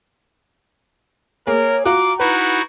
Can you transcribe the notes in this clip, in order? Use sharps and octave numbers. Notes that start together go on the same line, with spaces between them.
A#3 G#4 A#4 C#5
F4 F#4 A#5 D6
D#4 E4 F#4 B4 F#5